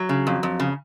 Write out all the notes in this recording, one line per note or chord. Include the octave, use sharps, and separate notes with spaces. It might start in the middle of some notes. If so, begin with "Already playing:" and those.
Already playing: F#3
C#3
F2
F2
C#3